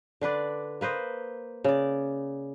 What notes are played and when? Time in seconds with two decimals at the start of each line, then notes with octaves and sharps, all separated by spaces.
0.21 D3 D4 B4 D5
0.81 A#3 B4 C5 D#5
1.64 C#3 D5